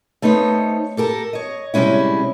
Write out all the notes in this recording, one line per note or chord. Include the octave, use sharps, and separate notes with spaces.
A3 B3 D#4 C5 C#5
G4 A4 A#4 A5
C#5 D#5
C3 G3 G#3 C#4 E4